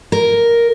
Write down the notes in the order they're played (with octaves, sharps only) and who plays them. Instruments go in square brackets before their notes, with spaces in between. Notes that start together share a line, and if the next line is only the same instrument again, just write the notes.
[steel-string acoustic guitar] A#4